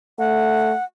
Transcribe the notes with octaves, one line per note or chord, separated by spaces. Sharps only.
A3 F#5